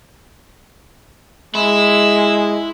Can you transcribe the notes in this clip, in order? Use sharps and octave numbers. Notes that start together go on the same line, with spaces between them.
G#3 E4 E6